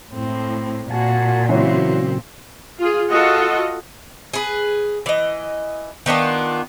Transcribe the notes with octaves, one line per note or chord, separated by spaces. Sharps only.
A2 C4
A#2 F#4 G#5 A5
C#3 E3 F#3 C4 F#4 C#5
F4 G#4
F4 F#4 A4 D#5 F#5
G#4 B4
E3 D#5
D#3 B3 D4 F4